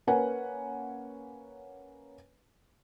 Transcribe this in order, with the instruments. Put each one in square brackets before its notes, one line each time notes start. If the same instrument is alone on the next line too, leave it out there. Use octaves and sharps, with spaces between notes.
[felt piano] A#3 C#4 A#4 B4 F#5 G#5